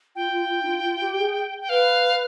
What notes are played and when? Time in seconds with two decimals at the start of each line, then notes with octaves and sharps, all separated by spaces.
0.15 F4 G5
0.32 F4
0.49 F4
0.62 D#4
0.67 F4
0.84 F4
1.01 G4
1.18 G#4
1.61 G5
1.69 B4 F5